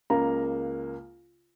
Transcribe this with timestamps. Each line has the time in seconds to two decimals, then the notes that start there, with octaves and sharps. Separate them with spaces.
0.10 C#2 C#3 A#3 A#5